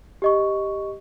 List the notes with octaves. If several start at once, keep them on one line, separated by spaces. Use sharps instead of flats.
G4 D#5 C#6